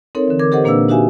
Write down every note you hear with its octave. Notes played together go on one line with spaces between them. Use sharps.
C4 D#4 A4 A#4 C#5
D3 E3
A#4 D6 G#6
G4 A4 A#4 C5 D#5 F#5
A#2 A#3 D4 B4 F5 E6
D#4 F#4 G4 E5 F5 G#5